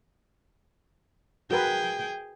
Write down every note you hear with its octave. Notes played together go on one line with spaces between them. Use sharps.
F#4 G#4 A#4 B4 G5